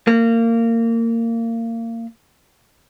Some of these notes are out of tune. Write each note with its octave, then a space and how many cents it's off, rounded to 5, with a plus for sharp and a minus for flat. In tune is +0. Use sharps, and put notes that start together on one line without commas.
A#3 -25